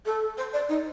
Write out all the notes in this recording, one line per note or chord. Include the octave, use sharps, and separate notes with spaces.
A4
C5
D5
D#4